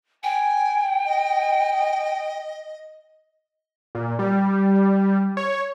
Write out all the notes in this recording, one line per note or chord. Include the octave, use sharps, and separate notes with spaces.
G5 G#5
D#5
A#2
G3
C#5